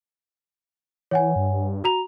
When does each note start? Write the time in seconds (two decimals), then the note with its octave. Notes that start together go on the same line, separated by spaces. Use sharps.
1.11 E3 C#5 F#5 G#5
1.36 G2
1.84 F#4 A#5 F7